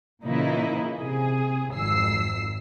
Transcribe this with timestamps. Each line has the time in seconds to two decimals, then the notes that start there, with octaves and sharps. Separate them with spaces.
0.24 A#2 C#3 E3 D#4 E4
0.99 C3 G#4
1.73 G#1 F2 E6 C7